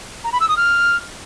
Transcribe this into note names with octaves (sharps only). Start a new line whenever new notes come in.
A#5
B5
E6
D#6
F6